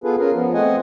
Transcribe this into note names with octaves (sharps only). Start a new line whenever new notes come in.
B3 F4 G#4 A4 B4
C#4 F4 G#4 A#4
F3 B3
A3 C4 D#5 F#5 G#5